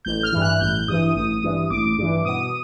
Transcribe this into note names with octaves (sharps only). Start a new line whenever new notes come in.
A1 G6
F6
G2 E3
F#6
A1 G6
G2 E3 D#6
A1 D#6
G2 E3
A1 D6
G2 E3
B2 D#6